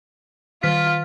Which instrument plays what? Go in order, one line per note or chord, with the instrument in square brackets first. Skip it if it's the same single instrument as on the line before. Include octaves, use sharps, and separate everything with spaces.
[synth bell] D#3 F6 B6 [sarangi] F4